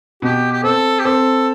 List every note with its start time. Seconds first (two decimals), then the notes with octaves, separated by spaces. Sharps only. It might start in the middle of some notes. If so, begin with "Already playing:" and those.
0.22 B2 G4
0.52 G4
0.63 C4 A4
0.99 G4
1.05 C4 A4